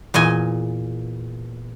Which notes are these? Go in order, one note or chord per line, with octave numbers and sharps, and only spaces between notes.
E2 A#2 D#5 G#5